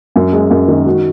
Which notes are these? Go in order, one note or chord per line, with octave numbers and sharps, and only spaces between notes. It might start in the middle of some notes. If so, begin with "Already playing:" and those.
F#2
G#3
F#2
D#3
F#4